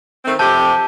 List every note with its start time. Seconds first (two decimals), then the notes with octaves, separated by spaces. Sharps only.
0.24 D#3 A3 C4
0.39 F2 C3 G4 A5